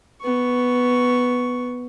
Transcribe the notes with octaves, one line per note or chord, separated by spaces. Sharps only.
B3 C#6